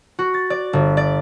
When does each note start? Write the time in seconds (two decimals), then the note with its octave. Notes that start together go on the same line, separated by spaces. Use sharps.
0.19 F#4
0.34 A6
0.50 D5
0.73 G1
0.97 D5